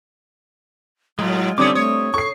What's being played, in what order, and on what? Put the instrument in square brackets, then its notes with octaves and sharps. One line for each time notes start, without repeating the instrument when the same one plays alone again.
[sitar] A2 [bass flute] F#3 [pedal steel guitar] G#3 F4
[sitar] D3 A3 C#5 [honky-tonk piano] G3 C4 [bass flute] C#4 [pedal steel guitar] D6 D#6
[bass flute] A3 [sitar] C#5 [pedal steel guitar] D#6
[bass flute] A4 [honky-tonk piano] C#6 C7